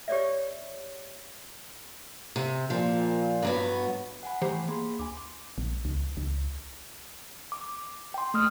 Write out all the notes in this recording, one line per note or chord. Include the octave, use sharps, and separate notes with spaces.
G4 C#5 D5 E5
C3
A#2 F3
G2 F#3 B3
F#5 G#5 B5
E3 A3 G4 C5 G5 A#5 C6
A#3 G#4 B5 C6
D2 G#5 D6
A#1
C#2
C#2
D6
G5 C6
A3 D#6 F6